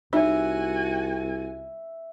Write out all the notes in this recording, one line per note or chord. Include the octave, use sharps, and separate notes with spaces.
C2 D#4 F#4 E5 G#5